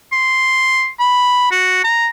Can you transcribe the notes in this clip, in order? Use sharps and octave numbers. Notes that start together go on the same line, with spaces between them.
C6
B5
F#4
A#5